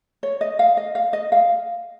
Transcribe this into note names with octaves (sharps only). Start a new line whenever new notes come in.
C#5
D#5
F5
D#5
F5
D#5
F5